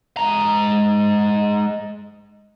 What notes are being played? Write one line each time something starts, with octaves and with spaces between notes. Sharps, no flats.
G#3 A#5